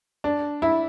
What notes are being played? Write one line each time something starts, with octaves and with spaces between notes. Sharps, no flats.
D4
E4